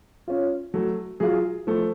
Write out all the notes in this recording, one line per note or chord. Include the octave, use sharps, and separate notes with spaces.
C#4 F4
F#3 A3
F#3 F4 G#4
F3 A3